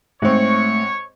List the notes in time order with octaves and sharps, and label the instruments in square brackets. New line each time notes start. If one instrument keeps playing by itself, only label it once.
[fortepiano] G#2 C4 [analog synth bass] A3 [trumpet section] C#5 C#6